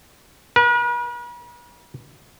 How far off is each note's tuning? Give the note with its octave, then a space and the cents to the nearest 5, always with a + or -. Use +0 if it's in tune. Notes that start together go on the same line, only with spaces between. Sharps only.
B4 -45